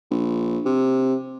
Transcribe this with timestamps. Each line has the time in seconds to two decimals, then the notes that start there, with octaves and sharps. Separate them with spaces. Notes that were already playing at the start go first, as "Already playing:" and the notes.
0.11 A#1
0.65 C3